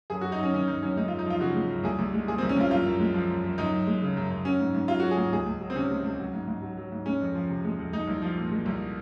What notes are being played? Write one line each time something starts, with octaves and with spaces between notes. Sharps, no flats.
F#2 G#4
F#2 F#4
D#4
F#3 C#4
D#3 C#4
F#2 D#4
F#2 C#4
G#3 D#4
F#2 F4
D#4
F3 F4
C#3 F#4
G#3
F#2
C2 G#4
C2
G#3
A#2 G#4
C2 C4
C#4
C2 F4
F#2 F4
F#2
G#3
F3
F#2
F#2
F#2 D#4
F#2
G#3
C#3
F#2
F#2
F#3 C#4
G#2
G#2
F#3 F4
F#3 F#4
G#4
G#2
C#2 G#4
C#2
F#3
C4
C3 C#4
C#2
C#2
F#3
G#2
G#2
F#3
F#3
G#2
G#3 C#4
F2
F3
C3
G#3
F2
G#3 D#4
C2
F3
A#2
G#3
C2